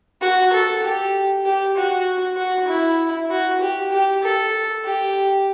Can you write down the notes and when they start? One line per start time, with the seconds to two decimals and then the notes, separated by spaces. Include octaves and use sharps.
0.21 F#4
0.53 A4
0.83 G4
1.45 G4
1.76 F#4
2.37 F#4
2.68 E4
3.30 F#4
3.61 G4
3.92 G4
4.23 A4
4.85 G4